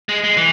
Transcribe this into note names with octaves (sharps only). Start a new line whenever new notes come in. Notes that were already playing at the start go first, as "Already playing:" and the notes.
G#3
G#3
E3